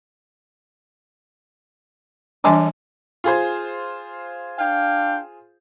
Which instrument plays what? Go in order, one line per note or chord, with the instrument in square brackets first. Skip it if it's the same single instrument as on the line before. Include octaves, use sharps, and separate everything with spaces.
[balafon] E3 G3 D4 [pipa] G#3 A4 D5
[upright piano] F4 G#4 C5
[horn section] D4 F5 G5